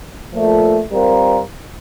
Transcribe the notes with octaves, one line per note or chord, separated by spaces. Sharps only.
A#2 F3 A3
G3 C4 F4 A#4